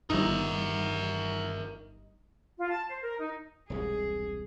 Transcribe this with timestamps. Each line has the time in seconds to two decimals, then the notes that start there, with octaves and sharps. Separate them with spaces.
0.10 G1 G2 D#3 E3 D#4 A#4 E5
2.59 F4
2.71 A5
2.88 C5
3.02 A#4
3.19 D#4
3.70 E1 C2 G#2 G#4